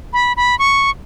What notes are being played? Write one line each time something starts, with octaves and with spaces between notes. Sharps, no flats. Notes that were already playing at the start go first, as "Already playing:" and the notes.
B5
B5
C#6